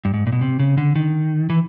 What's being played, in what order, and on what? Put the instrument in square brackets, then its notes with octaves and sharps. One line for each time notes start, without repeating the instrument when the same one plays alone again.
[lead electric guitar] G2
G#2
A#2
B2
C3
C#3
D3
D#3
E3